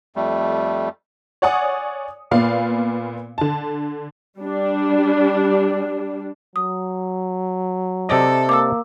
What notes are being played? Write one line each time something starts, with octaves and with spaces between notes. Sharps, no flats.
F2 G3 A3
C#5 D5 F#5 G#5 D#6
A#2 B3 D5 F5
D3 A5
G3 D4
F#3 D#6
C3 A4 D5 D#5
A#3 D6 E6